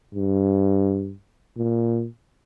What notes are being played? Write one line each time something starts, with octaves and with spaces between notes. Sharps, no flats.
G2
A#2